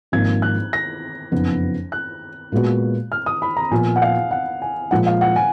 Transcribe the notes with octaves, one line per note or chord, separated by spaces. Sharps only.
G#1 G#2 F3 A#3 D#4 G#6
F#6
A#6
F#1 F2 F3 B3 D#4
F#6
A#2 G#3 B3 F#4
F6
D#6
B5
A#5
A#2 F3 B3 F4 G#5
F#5
F5
F#5
G#5
A#2 F3 G#3 F#5
F5
F#5
G#5